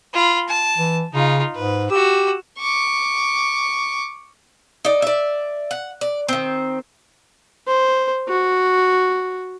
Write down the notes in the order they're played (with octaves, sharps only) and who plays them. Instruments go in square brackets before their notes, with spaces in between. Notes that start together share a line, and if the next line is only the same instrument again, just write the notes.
[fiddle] F4 B5
A5
[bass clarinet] E3
[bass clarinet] C#3 [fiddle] D#4 F4
[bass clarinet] G#2 [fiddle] B4
[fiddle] F#4 E6 [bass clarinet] G4
[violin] C#6 D6
[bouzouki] D#4 D5
D5 E5
F#5
D5
D#3 C4
[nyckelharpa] C5
F#4